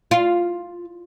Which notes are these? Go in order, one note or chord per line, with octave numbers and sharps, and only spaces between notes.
F4